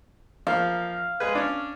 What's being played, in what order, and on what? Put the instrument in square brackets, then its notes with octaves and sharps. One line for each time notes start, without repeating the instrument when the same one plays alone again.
[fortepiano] F3 A#3 [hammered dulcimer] F5
[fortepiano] G#3 G#4 B4
C#4 D4